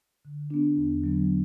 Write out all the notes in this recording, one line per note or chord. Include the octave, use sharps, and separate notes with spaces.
D3
B3 D4
E2
D3 F#3 B3